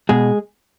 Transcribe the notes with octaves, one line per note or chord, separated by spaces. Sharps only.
B2 G#3 G#4